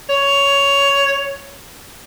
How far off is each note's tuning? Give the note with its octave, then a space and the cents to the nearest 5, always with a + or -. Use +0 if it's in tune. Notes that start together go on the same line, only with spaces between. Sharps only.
C#5 +10